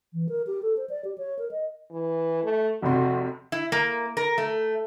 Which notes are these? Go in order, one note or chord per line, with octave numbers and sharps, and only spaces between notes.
E3
A#4
G4
A4
C5
D5
G4
C#5
A#4
D#5
E3
A3
F1 C3 F#4 C6
E4
A#3
A#4
A3